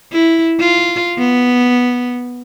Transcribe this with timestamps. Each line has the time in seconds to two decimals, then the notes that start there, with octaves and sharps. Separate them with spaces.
0.13 E4
0.60 F4
1.18 B3